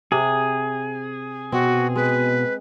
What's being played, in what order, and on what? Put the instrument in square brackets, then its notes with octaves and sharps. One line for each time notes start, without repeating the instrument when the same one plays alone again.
[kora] C3 [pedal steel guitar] G#4
[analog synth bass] B2 [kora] C4 [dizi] F#4
[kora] G#3 [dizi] B4